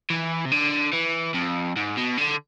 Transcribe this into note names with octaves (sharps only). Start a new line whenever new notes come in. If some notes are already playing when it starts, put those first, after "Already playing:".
E3
C3
D3
E3
F2
G#2
B2
D3